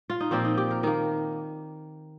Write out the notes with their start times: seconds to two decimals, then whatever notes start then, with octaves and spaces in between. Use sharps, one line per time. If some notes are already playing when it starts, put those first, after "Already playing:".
0.10 F4
0.20 D#4
0.31 A#2 F3 A#3 C4
0.45 D#4
0.57 G4
0.71 A#4
0.83 D#3 A#3 A#4